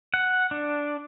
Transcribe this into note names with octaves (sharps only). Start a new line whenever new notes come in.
F#5
D4